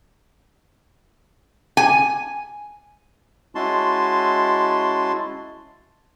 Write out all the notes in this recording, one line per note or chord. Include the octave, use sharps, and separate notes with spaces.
G#5
G#3 C#4 E4 F#4 A5 C6